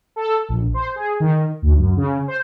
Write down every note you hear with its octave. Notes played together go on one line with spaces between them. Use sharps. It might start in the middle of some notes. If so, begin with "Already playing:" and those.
A4
A#1
C5
G#4
D#3
D2
F#2
C#3
C5